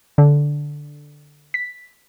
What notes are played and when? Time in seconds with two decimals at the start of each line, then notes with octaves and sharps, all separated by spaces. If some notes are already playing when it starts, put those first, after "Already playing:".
0.18 D3
1.54 B6